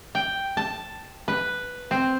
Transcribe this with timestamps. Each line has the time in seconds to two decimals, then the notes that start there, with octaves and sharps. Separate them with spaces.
0.15 G5
0.57 A5
1.28 B4
1.91 C4